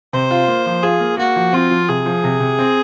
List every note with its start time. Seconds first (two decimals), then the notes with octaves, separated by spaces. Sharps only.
0.13 C3 C5
0.31 F4
0.48 A#3
0.66 F3
0.83 F4 G#4
1.00 A#3
1.18 A#3 F#4
1.36 F3
1.53 C4 F4
1.71 F3
1.88 C3 G#4
2.06 F3
2.24 C3
2.40 C3
2.59 C4